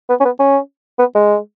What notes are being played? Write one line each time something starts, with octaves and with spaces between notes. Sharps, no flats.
B3
C#4
B3
C#4
B3
G#3